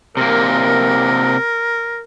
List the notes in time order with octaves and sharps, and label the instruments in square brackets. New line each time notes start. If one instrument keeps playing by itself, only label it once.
[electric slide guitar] C3 A#3 [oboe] A#4